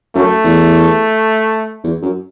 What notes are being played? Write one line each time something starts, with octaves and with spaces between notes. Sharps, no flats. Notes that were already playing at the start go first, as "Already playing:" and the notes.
F#2 A3
E2
E2
F#2